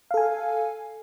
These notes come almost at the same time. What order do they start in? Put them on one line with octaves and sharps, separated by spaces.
F5 A4 G#5